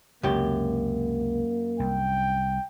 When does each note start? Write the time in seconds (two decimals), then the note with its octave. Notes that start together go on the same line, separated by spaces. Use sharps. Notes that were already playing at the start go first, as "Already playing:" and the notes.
0.23 C#2 F#2 C3 A#3 G4
1.80 C2 G5